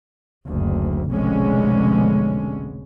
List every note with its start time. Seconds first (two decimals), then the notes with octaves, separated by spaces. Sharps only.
0.46 F#1 D2
1.10 F1 B1 D3 G#3 B3 C#4